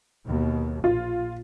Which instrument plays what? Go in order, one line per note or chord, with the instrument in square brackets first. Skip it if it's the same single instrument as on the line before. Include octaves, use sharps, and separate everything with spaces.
[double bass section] D#2 B2
[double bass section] A#1 [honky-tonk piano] F4